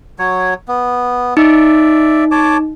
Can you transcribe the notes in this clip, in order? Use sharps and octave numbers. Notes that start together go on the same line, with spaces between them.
F#3 C#5
B3
D#4 D5 E5
C#5 A5 D6